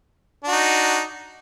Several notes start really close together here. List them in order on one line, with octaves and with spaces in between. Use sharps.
D4 F#4 D#4